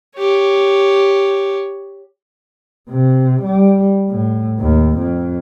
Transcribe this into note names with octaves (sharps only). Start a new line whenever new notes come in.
G4 C#5
C3
G3
A2
D#2
F2